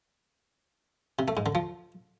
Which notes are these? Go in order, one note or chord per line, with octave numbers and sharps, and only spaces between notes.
C3
A3
G#2
D3
F3